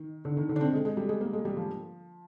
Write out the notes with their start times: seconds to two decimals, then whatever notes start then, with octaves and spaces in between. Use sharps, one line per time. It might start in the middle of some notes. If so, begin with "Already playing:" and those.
Already playing: D#3
0.25 D3
0.37 D#3
0.49 D3
0.56 D4
0.61 C4
0.73 G#3
0.85 G#3
0.97 G3
1.09 G#3
1.21 A#3
1.33 G#3
1.45 G3
1.57 F3